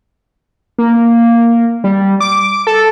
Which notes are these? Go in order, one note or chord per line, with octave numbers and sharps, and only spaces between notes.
A#3
G3
D6
A4